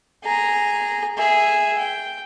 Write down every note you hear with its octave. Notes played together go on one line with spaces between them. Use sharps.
G#4 A#5
G#4 E5
G5